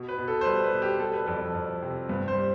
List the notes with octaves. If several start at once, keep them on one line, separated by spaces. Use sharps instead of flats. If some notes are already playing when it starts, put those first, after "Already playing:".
Already playing: B2
B4
B2
A4
C5
G3 B4
B4
B2
G4
G3 A4
B4
F2 A4
F2
C3
G2 B4
C5
G3